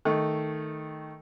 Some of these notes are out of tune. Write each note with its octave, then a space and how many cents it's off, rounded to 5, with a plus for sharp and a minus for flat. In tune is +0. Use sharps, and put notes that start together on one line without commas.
D#3 +0 A3 +0 C#6 +0